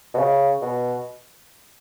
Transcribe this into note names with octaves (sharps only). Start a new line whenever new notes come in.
B2
C#3
B2